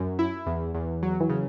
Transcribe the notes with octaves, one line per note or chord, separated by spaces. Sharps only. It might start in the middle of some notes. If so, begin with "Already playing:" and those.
Already playing: F#2 F#3
E4
E2
E2
F#3
E3
C#3